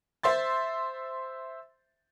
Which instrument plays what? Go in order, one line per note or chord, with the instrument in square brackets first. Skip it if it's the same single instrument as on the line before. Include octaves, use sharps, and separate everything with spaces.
[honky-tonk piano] C5 E5 C6 A6